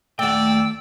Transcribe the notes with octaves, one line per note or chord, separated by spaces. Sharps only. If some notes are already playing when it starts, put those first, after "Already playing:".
D#2 A3 F#4 D5 G5 E6